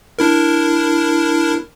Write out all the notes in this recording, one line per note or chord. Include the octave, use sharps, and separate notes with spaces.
D4 E4 A#4